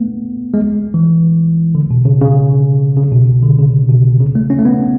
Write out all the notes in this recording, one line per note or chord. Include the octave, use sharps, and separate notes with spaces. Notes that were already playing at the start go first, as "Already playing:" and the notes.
Already playing: A3 B3
G#3
E3
D3
B2
C#3
C#3
C#3
B2
D3
C#3
B2
C#3
A3
C#4
A3
B3